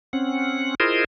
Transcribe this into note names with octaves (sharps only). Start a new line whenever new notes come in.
C4 C#4 F#5
E4 F4 G#4 A#4 C5 D#5